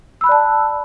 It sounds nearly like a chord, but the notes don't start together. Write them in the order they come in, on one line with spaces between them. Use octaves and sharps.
E6 B5 F#6 D5 A5